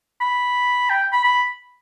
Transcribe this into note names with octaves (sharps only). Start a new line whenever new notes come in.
B5
G5
B5
B5